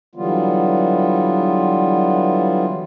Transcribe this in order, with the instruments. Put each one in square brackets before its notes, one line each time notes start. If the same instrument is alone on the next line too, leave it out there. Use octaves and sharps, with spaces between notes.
[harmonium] D3 E3 F#3 G3 B3 F4